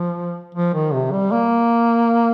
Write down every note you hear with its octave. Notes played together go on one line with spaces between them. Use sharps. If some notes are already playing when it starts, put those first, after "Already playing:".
Already playing: F3
F3
D#3
C3
G3
A#3